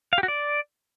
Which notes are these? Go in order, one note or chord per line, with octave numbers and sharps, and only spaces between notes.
F5
G4
F#4
D5